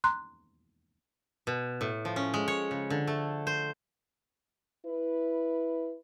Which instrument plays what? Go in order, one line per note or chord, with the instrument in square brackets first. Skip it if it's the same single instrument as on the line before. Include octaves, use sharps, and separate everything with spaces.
[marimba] A#5 C6 F#6
[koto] B2
A2
F3
C#4
G#3
C#5
C#3
D3
A3
C5
[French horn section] E4 B4